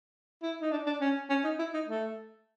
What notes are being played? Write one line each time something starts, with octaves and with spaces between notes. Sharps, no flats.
E4
D#4
D4
D4
C#4
C#4
D#4
E4
D#4
A3